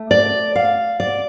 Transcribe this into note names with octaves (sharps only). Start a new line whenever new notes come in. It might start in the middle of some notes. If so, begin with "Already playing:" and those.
Already playing: A3
D5
F5
D5